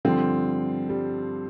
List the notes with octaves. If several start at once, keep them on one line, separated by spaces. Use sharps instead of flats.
G2 D3 F3 C4
G3